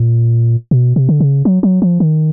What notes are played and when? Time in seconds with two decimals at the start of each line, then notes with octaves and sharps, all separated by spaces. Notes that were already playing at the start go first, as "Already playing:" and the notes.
Already playing: A#2
0.71 B2
0.96 C3
1.09 D3
1.20 C#3
1.45 F#3
1.63 F#3
1.82 F3
2.00 D#3